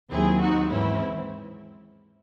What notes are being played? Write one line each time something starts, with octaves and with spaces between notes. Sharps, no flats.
D#2 D#3 F#3 C4 E4 G#4
D#4 F#4
G#2 E3 C4 C#4 E4